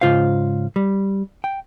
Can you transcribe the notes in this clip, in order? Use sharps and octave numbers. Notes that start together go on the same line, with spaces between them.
G#2 C#3 F4 C5 F5
G3
G5